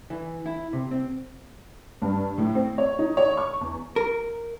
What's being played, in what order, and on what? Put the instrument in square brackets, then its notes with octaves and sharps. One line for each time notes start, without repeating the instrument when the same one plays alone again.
[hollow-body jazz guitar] E3
E4
C3
C4
[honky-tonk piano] G2
A2
C4
C#5
D#4
C#5
C#6
E2
[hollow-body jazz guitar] A#4